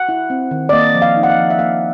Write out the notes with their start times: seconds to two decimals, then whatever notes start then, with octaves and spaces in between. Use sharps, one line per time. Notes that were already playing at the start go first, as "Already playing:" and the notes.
Already playing: F#5
0.09 E4
0.30 C4
0.51 D#3
0.69 D5
0.73 A#3 D#5
0.95 F3
1.02 F5
1.16 D#4
1.23 F#5
1.30 F5
1.38 F3
1.50 E5
1.59 A#3 F5